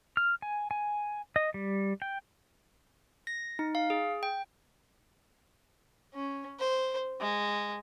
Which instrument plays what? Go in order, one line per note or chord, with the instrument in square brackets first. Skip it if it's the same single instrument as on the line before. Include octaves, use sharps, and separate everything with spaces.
[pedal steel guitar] F6
G#5
G#5
D#5
G3
G5
[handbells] A#6
D#4
F5
G#4
G5
[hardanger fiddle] C#4
C5
G#3